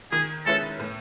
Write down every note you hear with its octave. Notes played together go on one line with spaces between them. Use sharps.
D#3 G#4
G#3 C#4 E4 A4 B4
A2